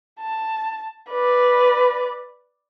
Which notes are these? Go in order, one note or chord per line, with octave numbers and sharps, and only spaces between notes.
A5
B4 D5